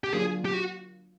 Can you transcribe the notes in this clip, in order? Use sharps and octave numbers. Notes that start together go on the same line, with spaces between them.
G4
D3 F#3 A#3 D4 F4 G#4
G4
F#4